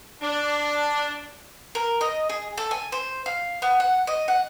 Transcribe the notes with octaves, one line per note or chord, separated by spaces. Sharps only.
D4
A#4
D#5
G#4
A4
G#5
C5
F5
B3
F#5
D#5
F#5